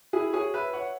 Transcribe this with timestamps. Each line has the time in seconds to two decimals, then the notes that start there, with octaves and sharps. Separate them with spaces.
0.13 E4 G#4
0.33 G#4 C#5
0.54 B4 E5
0.73 C#5 F#5